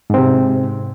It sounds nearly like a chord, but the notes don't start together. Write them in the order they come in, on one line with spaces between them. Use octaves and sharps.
G#2 C4 C3